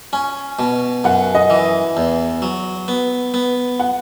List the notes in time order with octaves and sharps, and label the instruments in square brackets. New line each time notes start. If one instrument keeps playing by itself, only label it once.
[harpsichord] C#4 [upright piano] G#5
[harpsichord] B2
[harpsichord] F#2 [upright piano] F#5
[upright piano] D#5
[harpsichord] E3
E2
F#3
B3
B3
[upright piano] F#5